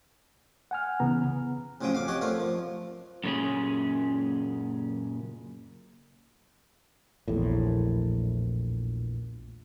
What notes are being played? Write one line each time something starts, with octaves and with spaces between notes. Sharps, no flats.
F#5 G#5 F6
C#3 E3 B3 A#5
A1 C#3 F3 F#3 G5 D#6
F2 F5 D6
G4 C#5 D#5 F#5
F3 A3 A#4 D5
F3
F#2 A#2 C#3 C#4 G#4
A#1 E2 A2